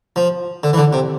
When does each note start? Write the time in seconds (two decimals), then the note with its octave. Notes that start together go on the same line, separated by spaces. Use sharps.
0.16 F3
0.63 D3
0.73 E3
0.77 D3
0.93 C3